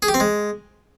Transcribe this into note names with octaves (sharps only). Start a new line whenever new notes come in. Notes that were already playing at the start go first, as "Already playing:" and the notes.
G#4
G4
C4
G#3